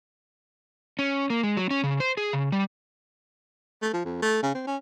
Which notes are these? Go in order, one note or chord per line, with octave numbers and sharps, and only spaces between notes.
C#4
A#3
G#3
F#3
C#4
C#3
C5
G#4
C#3
G3
A3
F3
F2
A3
C#3
C4
C#4